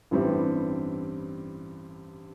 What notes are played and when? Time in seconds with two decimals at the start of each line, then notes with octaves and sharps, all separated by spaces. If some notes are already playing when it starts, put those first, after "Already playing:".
0.11 A1 G2 E3 G3 C4